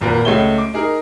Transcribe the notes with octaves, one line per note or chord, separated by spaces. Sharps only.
G#1 A#2 A#4 B4
C#2 G#3 A3 C#5 E5 G7
D6
D#4 G#4 A#4